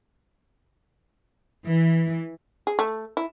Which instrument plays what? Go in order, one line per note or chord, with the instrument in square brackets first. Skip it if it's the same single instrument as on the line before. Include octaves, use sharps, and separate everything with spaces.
[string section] E3
[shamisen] G#4
A3
E4